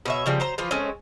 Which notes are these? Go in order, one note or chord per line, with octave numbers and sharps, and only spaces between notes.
B2 C#5 E5
C#3 F3 G3
F#3 C5 A#5
E3 F3 F4
G#3 A3 C4 C#4